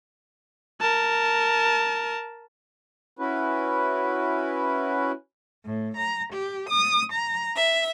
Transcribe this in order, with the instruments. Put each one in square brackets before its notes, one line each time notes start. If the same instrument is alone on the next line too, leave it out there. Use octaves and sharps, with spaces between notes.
[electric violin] A#4 A5
[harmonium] C#4 E4 F#4 B4
[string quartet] A2
A#5
G4
D#6
A#5
E5